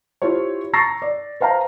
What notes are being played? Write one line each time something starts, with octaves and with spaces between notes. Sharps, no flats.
E4 F4 G4 C5 C#5
A#5 C#6 E6 A6 A#6 C7
D5
B4 C5 F5 G5 A#5